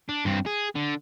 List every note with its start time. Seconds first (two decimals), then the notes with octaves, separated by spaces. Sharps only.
0.09 D4
0.25 G2 C4
0.47 G#4
0.76 D3